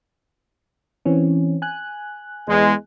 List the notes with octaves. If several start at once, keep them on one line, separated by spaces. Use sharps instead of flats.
E3 C4 C#4
G#5 F#6
E2 G#3